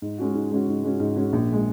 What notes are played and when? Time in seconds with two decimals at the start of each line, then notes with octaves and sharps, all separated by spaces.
0.02 G#2
0.18 G#3 C#4 F#4
0.34 G#2
0.51 G#3 C#4 F#4
0.68 G#2
0.83 G#3 C#4 F#4
1.00 G#2
1.16 G#3 C#4 F#4
1.33 A#1
1.52 G#3